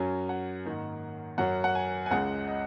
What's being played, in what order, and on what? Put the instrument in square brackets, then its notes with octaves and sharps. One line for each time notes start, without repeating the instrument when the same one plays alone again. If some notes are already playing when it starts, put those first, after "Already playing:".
Already playing: [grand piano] F#2 F#3 C#4 G#5
F#5
G#2 D#3 A#3 D#4
F#2 F#3 C#4 F#5
F#5
G#5
G#5
C#2 C#3 G#3 F#5
D#5